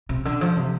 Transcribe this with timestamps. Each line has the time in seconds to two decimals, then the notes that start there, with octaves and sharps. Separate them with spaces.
0.09 C3
0.25 D3
0.41 F3
0.57 C3